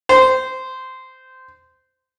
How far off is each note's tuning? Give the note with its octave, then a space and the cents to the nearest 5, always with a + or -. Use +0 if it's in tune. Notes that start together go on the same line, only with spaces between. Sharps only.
C5 -10